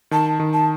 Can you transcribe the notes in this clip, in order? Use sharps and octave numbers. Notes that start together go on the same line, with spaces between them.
D#3 A5
D#3
A5